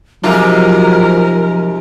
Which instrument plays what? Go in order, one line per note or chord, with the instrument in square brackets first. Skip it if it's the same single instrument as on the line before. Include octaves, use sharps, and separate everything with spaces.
[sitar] G#2 C3 F4 [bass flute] F3 [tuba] F#3 [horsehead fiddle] A#4